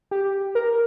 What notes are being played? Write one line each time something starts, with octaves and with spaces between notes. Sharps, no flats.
G4
A#4